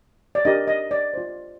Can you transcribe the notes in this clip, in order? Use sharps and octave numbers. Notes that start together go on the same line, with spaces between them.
D5
D4 G4 A#4 D#5
D#5
D5
F4 C5